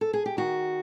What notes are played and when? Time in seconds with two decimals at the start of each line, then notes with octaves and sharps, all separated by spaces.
0.01 A4
0.13 G#4
0.26 G4
0.37 D#3 F#4